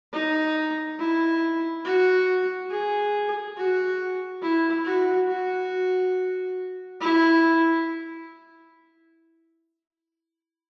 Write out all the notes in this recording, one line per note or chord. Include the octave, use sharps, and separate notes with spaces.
D#4
E4
F#4
G#4
F#4
E4
F#4
F#4
E4